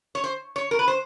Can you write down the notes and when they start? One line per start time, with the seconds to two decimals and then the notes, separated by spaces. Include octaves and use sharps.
0.15 C#5
0.24 C5
0.56 C#5
0.71 A#4
0.79 B4
0.88 C5